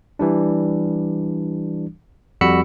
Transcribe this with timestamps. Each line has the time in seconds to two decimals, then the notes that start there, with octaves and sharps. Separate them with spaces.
0.19 E3 G3 D4
2.41 F2 G3 F#4 B5 E6 C#7